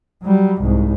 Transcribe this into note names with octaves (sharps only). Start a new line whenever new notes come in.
F#3 G3
C2 G#2